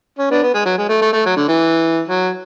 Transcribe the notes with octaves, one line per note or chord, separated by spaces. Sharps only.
C#4
B3 D4
B3
G#3
F#3
G#3
A3
A3
A3
F#3
D3
E3
F#3